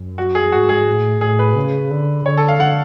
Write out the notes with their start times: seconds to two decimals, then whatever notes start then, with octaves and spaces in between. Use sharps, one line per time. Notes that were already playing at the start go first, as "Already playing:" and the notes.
Already playing: F#2
0.18 F#4
0.35 G#4
0.52 G#2 F#4
0.69 G#4
0.87 A2
1.21 A2 G#4
1.39 B4
1.56 C#3
1.90 D3
2.25 D3 C#5
2.37 A4
2.48 F5
2.60 F#5